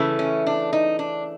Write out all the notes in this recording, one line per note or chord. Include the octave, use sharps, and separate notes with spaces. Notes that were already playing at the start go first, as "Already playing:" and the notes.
Already playing: C#3 E3 A3
C#4
D4
D#4
D4